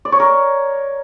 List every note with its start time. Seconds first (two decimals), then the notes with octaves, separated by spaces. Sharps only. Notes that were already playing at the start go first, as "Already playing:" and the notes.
0.05 D5
0.12 C#5
0.20 A#4